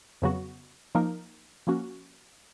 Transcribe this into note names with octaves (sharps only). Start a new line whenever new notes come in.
F2 C#3 F#3 B3 F#4
F3 A#3 D#4 A#4
F3 A#3 C#4 F#4